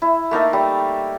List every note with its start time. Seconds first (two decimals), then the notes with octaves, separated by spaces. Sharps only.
0.02 E4
0.31 A3 A#3 D#4 A4
0.53 G3